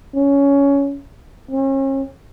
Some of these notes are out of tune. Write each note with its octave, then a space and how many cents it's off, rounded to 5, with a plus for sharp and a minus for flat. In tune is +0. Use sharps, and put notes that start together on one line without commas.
C#4 +15
C#4 -40